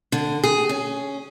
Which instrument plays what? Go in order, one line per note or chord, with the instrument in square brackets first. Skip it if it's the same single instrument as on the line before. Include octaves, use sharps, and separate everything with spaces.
[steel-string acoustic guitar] D3
G#4
C#4